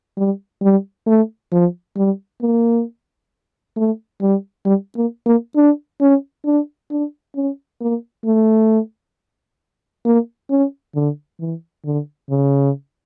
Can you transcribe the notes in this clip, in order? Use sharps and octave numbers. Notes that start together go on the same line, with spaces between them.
G3
G3
A3
F3
G3
A#3
A3
G3
G3
A#3
A#3
D4
C#4
D4
D4
C#4
A#3
A3
A#3
C#4
D3
E3
D3
C#3